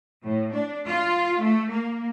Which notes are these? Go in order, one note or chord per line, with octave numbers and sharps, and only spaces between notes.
A2
D4
F4
A3
A#3